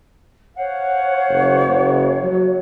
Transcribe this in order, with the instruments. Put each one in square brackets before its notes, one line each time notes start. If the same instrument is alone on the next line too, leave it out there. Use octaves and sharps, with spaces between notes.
[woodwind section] C5 F5 F#5 [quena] C#5
[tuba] F#1
F#1
F#3